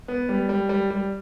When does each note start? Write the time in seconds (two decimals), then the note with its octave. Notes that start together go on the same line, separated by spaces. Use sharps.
0.08 B3
0.29 G3
0.49 G3
0.69 G3
0.90 G3